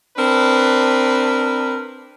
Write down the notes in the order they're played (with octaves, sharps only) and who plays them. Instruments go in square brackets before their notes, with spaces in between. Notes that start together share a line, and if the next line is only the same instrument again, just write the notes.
[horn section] C4 D4 A#4 B4